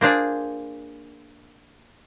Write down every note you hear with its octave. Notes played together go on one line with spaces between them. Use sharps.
A#3 D4 F4 G#4 C5